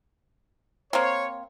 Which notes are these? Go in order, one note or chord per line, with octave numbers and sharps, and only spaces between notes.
A#3 C4 C#5